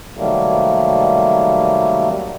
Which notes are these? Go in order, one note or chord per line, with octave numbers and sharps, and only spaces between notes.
C3 D#3 F#3 G3 A3 A#3